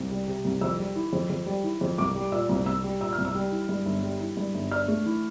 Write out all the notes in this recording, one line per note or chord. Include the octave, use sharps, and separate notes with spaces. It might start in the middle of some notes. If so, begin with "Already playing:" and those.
Already playing: C2
G3
C3
C2
F2 E6
G3
E3
F2
F2
G3
E3
F2
C2 D6
G3
A#2 E6
C2
C2 E6
G3
A#2 E6
F6
C2
E6
G3
E3
G2
G1
G3
E3
G2
G1
D4 F6
A3
E3